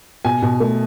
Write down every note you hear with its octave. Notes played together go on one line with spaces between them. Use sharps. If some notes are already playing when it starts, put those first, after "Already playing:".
B2 G#5
B2
A3